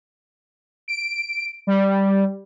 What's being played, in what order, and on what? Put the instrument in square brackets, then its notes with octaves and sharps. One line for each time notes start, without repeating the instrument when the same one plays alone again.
[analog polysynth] D7
G3